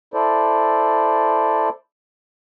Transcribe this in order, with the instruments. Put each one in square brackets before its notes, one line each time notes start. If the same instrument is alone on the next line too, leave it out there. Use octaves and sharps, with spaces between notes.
[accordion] E4 A4 C5 D5